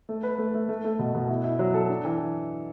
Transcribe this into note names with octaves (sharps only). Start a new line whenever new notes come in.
A3
B4
A3
A3
A3
A3
B2
B2
E4
E4
F#3
A4
D4
E3